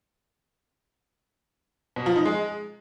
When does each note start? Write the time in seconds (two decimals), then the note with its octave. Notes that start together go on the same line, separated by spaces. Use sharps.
1.96 B2
2.06 F3
2.16 D#4
2.25 G#3